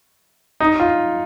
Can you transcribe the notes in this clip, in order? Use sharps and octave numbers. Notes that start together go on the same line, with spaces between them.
D#4
F4